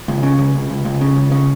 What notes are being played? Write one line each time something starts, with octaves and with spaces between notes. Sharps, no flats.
C#2
C#3
C#2
C#2
C#2
C#2
C#3
C#2
C#3